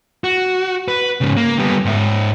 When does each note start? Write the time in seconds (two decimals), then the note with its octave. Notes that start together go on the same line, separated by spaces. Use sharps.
0.24 F#4
0.88 B4
1.21 G#2 C#3
1.37 A#3
1.59 G3 B3
1.85 G#2 E5